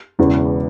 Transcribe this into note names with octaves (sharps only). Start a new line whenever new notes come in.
E1 E2 C#3 E3